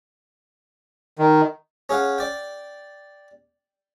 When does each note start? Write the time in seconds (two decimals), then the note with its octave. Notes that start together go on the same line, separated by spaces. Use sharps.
1.18 D#3
1.89 C#4 G#4 F5 F#5
2.18 D5 G5